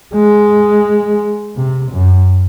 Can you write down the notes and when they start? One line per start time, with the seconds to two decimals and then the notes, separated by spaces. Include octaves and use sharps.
0.14 G#3
1.56 C3
1.92 F#2